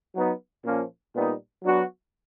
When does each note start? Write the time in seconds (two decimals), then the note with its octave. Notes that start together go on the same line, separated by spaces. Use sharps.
0.14 F#3 B3 D#4
0.64 A#2 F3 A#3 C#4 F4
1.14 A#2 G3 B3 D#4
1.64 F#3 B3 D4 F#4